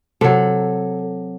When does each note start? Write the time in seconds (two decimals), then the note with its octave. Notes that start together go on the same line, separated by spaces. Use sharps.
0.21 C3 F#3 A4